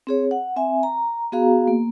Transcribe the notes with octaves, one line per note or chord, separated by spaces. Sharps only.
C4 G#4 C#5
F#5
C4 E5 G#5
A#5
B3 F#4 G#4 F5 A#5
A#3